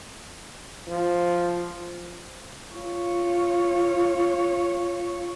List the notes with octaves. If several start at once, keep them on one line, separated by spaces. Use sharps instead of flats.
F3
F4 C#5